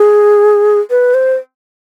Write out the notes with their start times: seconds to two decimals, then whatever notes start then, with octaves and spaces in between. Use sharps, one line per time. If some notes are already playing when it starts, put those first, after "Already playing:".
Already playing: G#4
0.90 B4
1.14 C5